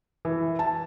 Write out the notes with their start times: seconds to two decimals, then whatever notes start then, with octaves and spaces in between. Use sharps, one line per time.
0.25 E3
0.59 A5